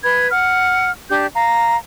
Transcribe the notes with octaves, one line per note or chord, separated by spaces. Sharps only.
B4 B5 G#6
F#5 F6
D4 G4 G6
F5 A#5